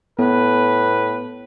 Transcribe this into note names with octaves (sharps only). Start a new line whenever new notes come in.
A2 B3 B4